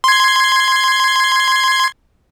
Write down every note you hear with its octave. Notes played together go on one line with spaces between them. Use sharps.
C6 G#6